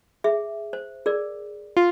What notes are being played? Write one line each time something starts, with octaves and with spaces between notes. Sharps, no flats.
G#4 E5
C5
G#4 A#4 D5
F4